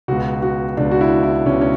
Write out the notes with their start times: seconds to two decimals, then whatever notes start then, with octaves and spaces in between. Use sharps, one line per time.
0.08 C#2 B2 F#4
0.42 F#4
0.77 C#2 B2 D4
0.91 F#4
1.01 E4
1.23 E4
1.46 C#2 B2 C#4
1.61 C#4